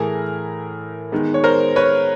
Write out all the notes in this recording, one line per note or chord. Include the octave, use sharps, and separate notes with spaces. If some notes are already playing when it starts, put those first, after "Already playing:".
Already playing: A2 E3 A3 G#4 A#4
D#3 G#3 B3
C#5
A#4 C5
B4 C#5